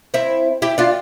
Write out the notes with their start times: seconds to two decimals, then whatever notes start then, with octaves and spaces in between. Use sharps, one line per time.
0.14 C4 E4
0.62 E4 G4
0.78 D4 F4